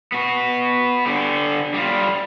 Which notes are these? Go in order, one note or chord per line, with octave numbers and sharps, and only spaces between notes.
B3 F#4
D3 G4
G3 F4